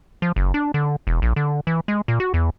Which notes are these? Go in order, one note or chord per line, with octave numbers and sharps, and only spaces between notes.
F3
F#1
D4
D3
E1
A#1
D3
E3
G#3
A#2
F#4
E2